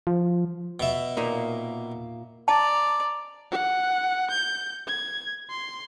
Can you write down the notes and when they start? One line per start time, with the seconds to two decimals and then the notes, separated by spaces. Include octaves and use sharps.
0.07 F3
0.80 B2 E5
1.17 A#2 A#3 D#4
2.48 D5 A5 A#5
3.52 F#5
4.31 G6
4.88 G#6
5.50 C6